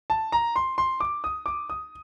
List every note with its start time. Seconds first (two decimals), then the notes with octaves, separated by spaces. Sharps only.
0.10 A5
0.32 A#5
0.56 C6
0.78 C6
1.00 D6
1.24 D#6
1.46 D6
1.70 D#6